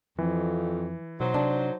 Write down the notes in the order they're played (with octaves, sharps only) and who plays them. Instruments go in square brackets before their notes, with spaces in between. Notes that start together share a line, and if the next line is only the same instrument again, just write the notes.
[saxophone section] F2 [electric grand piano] E3 [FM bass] F3
[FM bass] B2 [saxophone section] F#3 D#4 C5
[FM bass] C3 [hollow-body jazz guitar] D4